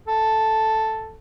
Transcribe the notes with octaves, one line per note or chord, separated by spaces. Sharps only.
A4